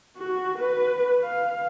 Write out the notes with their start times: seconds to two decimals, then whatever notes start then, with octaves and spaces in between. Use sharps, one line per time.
0.18 F#4
0.59 B4
1.23 F5